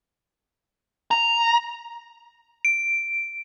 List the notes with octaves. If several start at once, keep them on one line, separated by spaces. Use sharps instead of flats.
A#5
D7